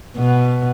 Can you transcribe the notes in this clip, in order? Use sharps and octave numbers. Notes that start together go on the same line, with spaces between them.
B2